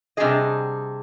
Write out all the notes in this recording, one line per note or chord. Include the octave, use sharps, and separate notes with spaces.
C3 G3 D4 G#4 D#5